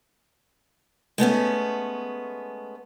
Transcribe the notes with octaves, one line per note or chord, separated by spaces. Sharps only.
G#3 A3 B3 C#4